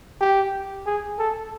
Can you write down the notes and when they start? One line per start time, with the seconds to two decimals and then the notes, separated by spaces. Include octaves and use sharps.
0.21 G4
0.86 G#4
1.19 A4